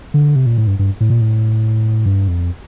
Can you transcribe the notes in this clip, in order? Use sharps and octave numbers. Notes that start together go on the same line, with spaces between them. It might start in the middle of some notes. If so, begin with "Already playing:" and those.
D3
C3
A#2
A2
G2
G2
A2
A#2
A2
G2
F2